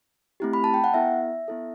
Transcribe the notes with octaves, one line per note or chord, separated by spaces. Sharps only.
A3 C4 E4 G4
B5
A5
G5
F#5
B3 E4 A4 E5
B3 E4 A4